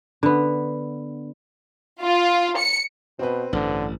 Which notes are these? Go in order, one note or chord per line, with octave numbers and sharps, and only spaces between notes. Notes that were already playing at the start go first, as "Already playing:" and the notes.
D3 B3
F4
C#7
B2 C4 B4
A1 G2 D3